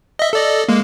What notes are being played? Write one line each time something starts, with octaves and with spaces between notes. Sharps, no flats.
D#5 E5
A4 D5 D#5
G#3 A#3